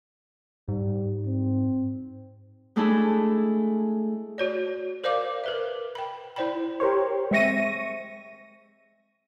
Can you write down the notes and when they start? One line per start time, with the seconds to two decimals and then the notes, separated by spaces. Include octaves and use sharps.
0.68 G#2 G3
1.26 C4
2.76 G#3 A3 D4 E4 G#4 A4
4.38 F#4 C#5 D5
5.04 A#4 C5 D5 F5 D6
5.44 A#4 B4 E5
5.95 G5 B5
6.36 E4 C5 D5 G5 B5
6.80 G4 A#4 C5 C#5
7.31 G#3 C4 E5 C#6 A#6 D#7